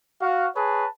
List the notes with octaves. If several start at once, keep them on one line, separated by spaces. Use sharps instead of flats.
F#4 F5
G#4 B4 C#5 A5